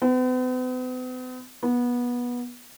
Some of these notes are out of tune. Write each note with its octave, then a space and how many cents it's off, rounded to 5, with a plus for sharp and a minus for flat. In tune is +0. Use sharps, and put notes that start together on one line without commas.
B3 +45
B3 -20